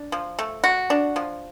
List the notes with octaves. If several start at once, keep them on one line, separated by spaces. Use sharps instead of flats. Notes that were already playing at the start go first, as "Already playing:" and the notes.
Already playing: D4
F3
A3
F#4
D4
F3